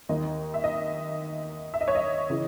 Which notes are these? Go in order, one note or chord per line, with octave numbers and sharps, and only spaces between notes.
D#2 D#3 D#5
E5
D#5
E5
D#5
C#5
D#5
C#3 E3